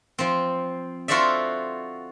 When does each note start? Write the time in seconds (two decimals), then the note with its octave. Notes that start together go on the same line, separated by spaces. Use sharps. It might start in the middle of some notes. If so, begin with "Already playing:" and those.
0.19 F3 C4
1.08 F4 F#4 A4 C5 D5 E5